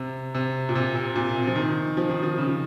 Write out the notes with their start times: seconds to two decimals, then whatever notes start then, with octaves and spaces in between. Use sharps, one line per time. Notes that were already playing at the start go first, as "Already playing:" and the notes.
Already playing: C3
0.35 C3
0.69 A#2
0.75 C3
0.96 C3
1.16 A#2
1.36 C3
1.47 F3
1.56 D#3
1.97 F3
2.09 D#3
2.23 F3
2.38 C#3